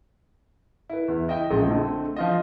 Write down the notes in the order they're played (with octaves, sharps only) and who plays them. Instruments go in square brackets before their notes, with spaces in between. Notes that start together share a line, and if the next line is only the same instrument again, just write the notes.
[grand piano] E4 B4
E2
E4 D#5 E5 G5
A#1 C#3 G#3 D#5
D3 A3 C4
F3 F4 D#5